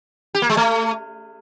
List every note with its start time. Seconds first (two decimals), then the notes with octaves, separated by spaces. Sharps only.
0.35 G4
0.42 A#3
0.50 G#3
0.57 A3